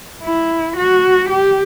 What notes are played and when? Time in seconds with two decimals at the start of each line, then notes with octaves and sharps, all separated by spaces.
0.22 E4
0.77 F#4
1.29 G4